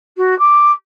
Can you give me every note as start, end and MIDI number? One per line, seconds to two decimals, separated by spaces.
0.17 0.37 66
0.39 0.72 86